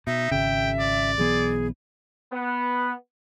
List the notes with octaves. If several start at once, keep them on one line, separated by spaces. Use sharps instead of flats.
B2 D#4 E5
G#1 C#3 G5
D5
B1 E3 B3 G#4
B3